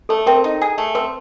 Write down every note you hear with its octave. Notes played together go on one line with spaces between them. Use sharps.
A3 A4
C4 A#4
D#4
G#4
A3
C4 B4